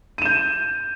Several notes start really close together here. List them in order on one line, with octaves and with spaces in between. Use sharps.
D#7 E7 G6